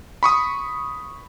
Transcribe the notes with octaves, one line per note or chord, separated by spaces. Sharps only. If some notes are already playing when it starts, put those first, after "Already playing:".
B5 C#6 D#6